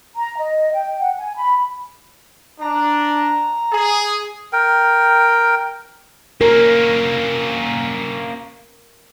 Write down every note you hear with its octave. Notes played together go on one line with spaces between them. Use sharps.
A#5
D#5
G5
F#5
G#5
B5
D4 A#5
G#4
A#4 G5
A#3 C#4 A#4